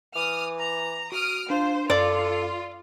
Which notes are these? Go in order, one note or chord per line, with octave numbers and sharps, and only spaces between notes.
E3 D6 D#6 F6
A#5
F#4 D#6 F6 D7
D4 F4 C5
F#2 F4 A4 D5